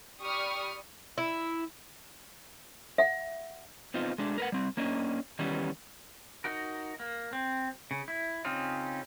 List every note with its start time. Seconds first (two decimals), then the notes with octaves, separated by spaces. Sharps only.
0.20 G4 D5 B5 C#6 D#6 F6
1.18 E4
2.98 E5 F#5
3.94 B3 C4 D#4 F4
4.18 G#3 A3 D4
4.38 A#4 B4 F#5
4.52 G3 C4
4.77 A#3 C#4 D4 D#5
5.39 D#3 E3 G3 B3 C#4
6.44 D#4 F#4 A#4
7.00 A#3
7.33 C4
7.91 C#3
8.08 E4
8.45 C#3 C4 C#4 D#4 F4